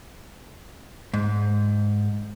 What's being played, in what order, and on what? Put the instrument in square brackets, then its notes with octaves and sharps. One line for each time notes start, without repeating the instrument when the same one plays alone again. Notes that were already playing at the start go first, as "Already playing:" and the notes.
[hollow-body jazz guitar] G#2